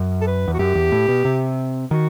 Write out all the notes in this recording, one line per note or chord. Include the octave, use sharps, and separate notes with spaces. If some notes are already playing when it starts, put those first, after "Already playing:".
Already playing: F#2
A4
B4
E2
F#4
F#2 G4
E2
A2
B2
C3
D#3 F#4